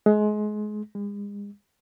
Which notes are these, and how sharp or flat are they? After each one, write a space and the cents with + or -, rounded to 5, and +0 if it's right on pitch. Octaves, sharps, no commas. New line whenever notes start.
G#3 +25
G#3 -40